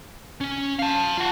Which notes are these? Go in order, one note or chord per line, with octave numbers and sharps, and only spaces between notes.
C#4
F5 A5
F4 F#5